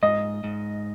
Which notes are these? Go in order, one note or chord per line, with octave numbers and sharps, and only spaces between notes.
G#2 D#5
G#2